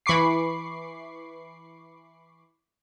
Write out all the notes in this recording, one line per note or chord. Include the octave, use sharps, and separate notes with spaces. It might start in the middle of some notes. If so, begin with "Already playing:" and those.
E3 B5 C#6 D6 C7